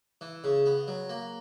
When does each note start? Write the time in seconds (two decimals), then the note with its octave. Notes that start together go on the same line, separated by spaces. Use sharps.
0.21 E3
0.44 C#3
0.66 B3
0.88 F#3
1.09 A#3